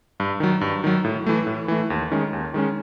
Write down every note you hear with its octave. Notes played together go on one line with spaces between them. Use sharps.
G2
D#3 F#3
G2
D#3 F#3
A2
E3 A3
A2
E3 A3
D#2
D#3 G#3 C#4
D#2
D#3 G#3 C#4